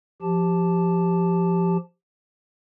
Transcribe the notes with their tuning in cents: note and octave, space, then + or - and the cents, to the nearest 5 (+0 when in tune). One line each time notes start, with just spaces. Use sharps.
F3 -5 G4 +0 A5 +0